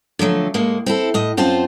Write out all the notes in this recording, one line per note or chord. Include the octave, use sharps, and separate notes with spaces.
D3 F3 F#3 A3
A2 G#3 A#3
C4 E4 A4
A2 D#5
F#2 C4 F4 C5 A5